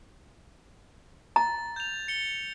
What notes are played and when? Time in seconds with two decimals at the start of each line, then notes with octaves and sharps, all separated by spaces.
1.36 A#5 A6
1.76 G6 F7
2.08 C#7 G7